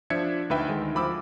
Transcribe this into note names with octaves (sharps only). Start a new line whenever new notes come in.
F3 D4 E5 G#6 C#7
D2 D#4 B4 E5 G5
D#3 G#3
D2 F3 B5 D6 E6